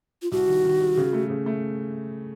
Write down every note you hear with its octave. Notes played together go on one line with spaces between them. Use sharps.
F4
C2 F#4
D#3
D#3
G3
C#3
A3
C#3
A3